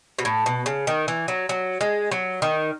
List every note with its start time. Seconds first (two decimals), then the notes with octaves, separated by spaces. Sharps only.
0.19 B2
0.25 A2
0.46 B2
0.66 C#3
0.87 D#3
1.08 E3
1.28 F#3
1.49 F#3
1.81 G#3
2.11 F#3
2.42 D#3